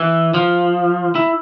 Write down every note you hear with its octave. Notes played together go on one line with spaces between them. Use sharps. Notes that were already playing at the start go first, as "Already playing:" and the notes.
Already playing: E3
F3
E4